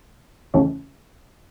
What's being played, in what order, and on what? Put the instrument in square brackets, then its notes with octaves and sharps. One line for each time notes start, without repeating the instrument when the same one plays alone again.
[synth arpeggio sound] E2 C#3 E3 A3 C#4